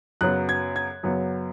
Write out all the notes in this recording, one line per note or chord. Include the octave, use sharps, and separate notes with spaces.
F#2 C#3 F#3 B3 F#6
G#6
G#6
F#2 C#3 F#3 B3